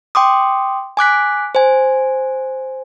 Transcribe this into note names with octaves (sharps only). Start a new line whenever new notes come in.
G5 C6 D6 D#6
G#5 D6 F#6 B6
C5 G#5